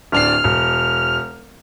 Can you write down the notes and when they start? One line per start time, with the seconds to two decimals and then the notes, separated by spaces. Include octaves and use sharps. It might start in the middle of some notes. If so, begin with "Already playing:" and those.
0.12 D1 D4 F6 C7
0.44 E1